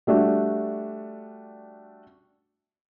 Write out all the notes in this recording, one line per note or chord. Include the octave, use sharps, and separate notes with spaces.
G3 A3 D4 F#4